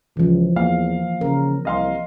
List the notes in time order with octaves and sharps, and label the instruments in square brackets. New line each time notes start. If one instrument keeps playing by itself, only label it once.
[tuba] C#2 [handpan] E3 F3
[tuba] E2 [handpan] A#3 [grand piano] F5
[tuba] C#3 [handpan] A#4
[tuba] C2 [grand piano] D#5 F5 C6